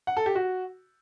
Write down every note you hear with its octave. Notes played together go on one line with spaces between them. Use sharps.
F#5
A4
G4
F#4